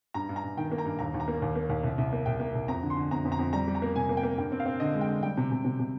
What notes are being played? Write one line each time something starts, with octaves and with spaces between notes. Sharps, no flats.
G2 A#5
G2
A#5
G2
D#3 G5
A#3
A#5
G2
D#2 A#5
D#2
A#5
A#3
D#2
A#3
D#2
C2
C2
A#3
C2 G5
A#3
C2
F2 A#5
D3
C6
D3
F2 A#5
F2
A#5
F2
G3 A#5
G3
A#5
A#3
C3 G#5
A#3
G5
A#3
G2 G5
C4
F5
C4
D3 D#5
G#3
G5
D3
G3 G5
C3
C3
C3
C3